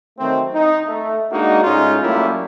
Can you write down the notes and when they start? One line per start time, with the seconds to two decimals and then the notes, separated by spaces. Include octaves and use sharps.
0.19 D#3 F#3 A3 C4
0.54 D#4
0.87 A3
1.32 G#3 A#3 D4 D#4 F#4
1.64 A2 G#3 C#4 D#4 F4
2.02 F#3 G3 A3 A#3 C#4 E4